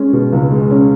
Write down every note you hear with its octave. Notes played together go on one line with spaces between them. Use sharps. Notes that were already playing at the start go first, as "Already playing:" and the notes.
Already playing: G#3 C#4
B2
C#2
G#3
C#4